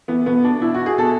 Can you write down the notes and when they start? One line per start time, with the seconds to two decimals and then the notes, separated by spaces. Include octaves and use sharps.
0.08 E3 B3
0.26 B2 B3
0.44 D4
0.61 B2 E4
0.74 F#4
0.86 G#4
0.97 B2 A4